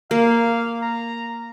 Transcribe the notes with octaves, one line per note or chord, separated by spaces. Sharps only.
A#3 F5
A#5